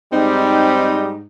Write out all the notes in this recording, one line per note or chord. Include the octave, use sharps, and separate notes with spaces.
G#2 G3 C4 D#4